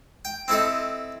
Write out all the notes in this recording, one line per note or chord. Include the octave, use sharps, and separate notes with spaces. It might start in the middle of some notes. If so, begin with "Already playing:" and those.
G5
C4 E4 A4 D#5